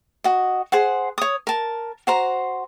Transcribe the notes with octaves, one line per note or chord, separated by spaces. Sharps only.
F#4 D#5
G#4 C5 F#5
C#5 D#6
A#4 A5
F#4 C5 A#5